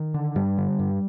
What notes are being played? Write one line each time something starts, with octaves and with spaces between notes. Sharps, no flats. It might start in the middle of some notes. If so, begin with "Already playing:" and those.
Already playing: D#3
D3
G2 G3
D3
G2